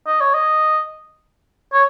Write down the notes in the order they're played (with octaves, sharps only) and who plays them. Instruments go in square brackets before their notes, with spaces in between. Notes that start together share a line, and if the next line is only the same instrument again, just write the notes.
[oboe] D#5
C#5
D#5
C#5